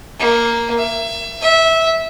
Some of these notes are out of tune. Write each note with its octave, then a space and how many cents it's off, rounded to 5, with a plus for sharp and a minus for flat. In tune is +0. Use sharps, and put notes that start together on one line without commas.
A#3 +0
E5 +30
E5 -15